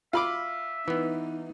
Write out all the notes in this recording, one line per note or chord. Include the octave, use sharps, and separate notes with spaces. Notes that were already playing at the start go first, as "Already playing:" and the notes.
F4 E5 B5 D6
E3 B3 D#4